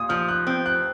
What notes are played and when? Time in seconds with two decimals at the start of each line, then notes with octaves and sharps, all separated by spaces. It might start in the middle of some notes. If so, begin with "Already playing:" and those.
Already playing: A#2 D#6
0.09 F3 F6
0.29 F#6
0.47 C4
0.66 F#6